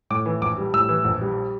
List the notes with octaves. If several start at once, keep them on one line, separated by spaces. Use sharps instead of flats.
A2 D6
E3
A#1 D6
G3
A2 E6
E3
A#1
G3